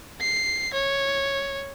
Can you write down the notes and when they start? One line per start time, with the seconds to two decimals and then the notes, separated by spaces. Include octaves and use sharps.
0.21 C7
0.74 C#5